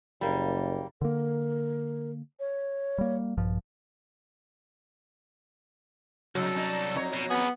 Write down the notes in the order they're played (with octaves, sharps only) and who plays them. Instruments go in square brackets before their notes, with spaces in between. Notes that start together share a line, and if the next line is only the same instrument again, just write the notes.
[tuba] F#1 [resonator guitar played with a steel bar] G3 A#3
[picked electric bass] D3 A#3 [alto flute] A#4
[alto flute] C#5
[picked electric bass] G3 A#3
A#1 G2 F3
[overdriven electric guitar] C2 A4 [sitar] C#3 D#4 [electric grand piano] F#3
[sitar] C#4 D#4 D5
F2 D#4 C#5
[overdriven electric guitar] B2
[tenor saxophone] B3 [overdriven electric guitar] G#4 B4